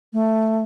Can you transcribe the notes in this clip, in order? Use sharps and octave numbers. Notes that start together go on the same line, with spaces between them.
A3